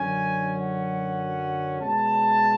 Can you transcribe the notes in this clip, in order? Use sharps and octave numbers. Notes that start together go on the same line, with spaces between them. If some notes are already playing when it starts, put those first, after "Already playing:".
Already playing: F#2 D3 F#3 C#4 G#5
F#5
B2 G#3 C#4 A5